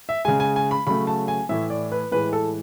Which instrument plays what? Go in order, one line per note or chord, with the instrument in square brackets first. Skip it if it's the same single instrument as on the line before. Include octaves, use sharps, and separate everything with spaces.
[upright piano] E5
C#3 G#3 G#5
G#5
G#5
B5
C#3 F#3 A3 B5
A5
G#5
A2 E3 A3 E5
D5
B4
A2 E3 G#3 B4
A4